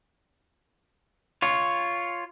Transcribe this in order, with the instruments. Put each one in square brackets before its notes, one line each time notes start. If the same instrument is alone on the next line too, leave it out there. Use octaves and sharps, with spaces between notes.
[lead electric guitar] F4 C#5